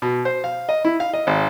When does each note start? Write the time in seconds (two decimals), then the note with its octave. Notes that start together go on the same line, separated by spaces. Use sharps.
0.02 B2
0.25 C5
0.44 F5
0.69 D#5
0.85 E4
1.00 F5
1.13 D#5
1.27 G#1